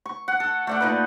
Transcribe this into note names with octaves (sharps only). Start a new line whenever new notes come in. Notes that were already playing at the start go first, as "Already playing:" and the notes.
C#6
F#5
A4
A3 D5 F#5
A#2 D#4 B4